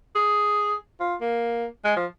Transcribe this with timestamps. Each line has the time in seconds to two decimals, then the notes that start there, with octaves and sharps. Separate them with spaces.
0.15 G#4
1.00 F4
1.21 A#3
1.85 G#3
1.96 F3